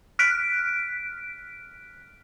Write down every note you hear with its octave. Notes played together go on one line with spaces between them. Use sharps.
F6 F#6 B6 D7